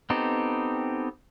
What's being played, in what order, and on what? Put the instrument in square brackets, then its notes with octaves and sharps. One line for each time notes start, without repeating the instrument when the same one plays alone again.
[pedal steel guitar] B3 C4 D#4 G4 A4